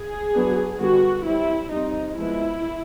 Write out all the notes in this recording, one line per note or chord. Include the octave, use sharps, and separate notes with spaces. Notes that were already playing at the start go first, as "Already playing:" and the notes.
Already playing: G#4
F#3 B3 D4
D3 G3 B3 F#4
G3 C4 E4
G3 C4 D#4
F3 G#3 B3 E4